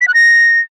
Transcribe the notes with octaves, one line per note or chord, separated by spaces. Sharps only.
B6
F#6
A#6